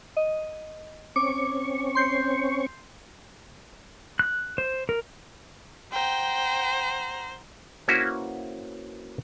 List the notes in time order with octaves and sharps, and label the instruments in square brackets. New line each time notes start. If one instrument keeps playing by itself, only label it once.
[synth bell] D#5
[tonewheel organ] C4 C#4 C#6 [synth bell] D6
[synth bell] C6 G6 C7
[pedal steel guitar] F#6
C5
A#4
[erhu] C5 [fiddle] F#5 A#5 [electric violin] G5
[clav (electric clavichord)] A#3 C#4 E4 F#4 B4 C5